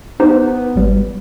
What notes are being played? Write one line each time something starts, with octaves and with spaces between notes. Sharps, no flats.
B3 D#4 G4 C5
G#1 G3